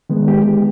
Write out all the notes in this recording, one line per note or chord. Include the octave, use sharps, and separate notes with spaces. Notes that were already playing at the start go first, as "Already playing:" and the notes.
D#3 G#3 B3
G4